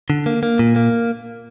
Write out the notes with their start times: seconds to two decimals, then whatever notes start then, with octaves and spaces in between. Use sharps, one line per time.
0.10 D3
0.26 A#3
0.43 A#3
0.59 A#2
0.76 A#3